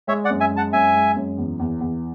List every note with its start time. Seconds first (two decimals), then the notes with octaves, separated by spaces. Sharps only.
0.08 G#3 C#5 E5
0.24 D5 F#5
0.30 F#2
0.40 E5 G#5
0.51 G#3
0.56 F#5 A5
0.73 F#2 E5 G#5
0.95 G#3
1.16 F#2
1.38 E2
1.60 E2
1.81 E2